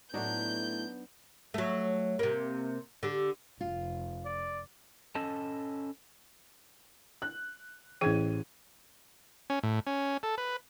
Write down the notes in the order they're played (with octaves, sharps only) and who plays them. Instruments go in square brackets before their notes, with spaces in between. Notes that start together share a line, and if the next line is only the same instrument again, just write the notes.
[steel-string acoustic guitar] A2 A3 [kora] F#3 D4 D#4 [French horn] B3 [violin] G6
[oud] F#3 A3
C3 A#3
D3 G4
[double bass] F1 [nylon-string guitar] F4
[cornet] D5
[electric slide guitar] C#4 A4 D#5 A5
[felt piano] F#6
[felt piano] A1 G#6 D#7 [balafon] E3 G#4 G5
[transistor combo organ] C#4
A2
C#4
A4
B4